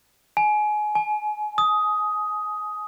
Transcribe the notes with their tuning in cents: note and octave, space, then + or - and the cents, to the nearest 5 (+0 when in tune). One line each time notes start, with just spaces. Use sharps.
G#5 +25
G#5 +40
D#6 +10